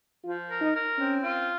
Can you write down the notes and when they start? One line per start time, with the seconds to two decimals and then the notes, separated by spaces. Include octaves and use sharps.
0.24 F3 F4
0.49 A#4
0.61 D#4
0.73 A#4
0.97 C4 C#4
1.22 F4